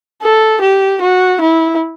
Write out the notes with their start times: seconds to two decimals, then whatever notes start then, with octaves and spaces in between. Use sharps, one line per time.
0.22 A4
0.61 G4
1.01 F#4
1.41 E4